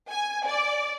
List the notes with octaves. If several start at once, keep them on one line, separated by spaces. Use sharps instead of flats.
G#5
D5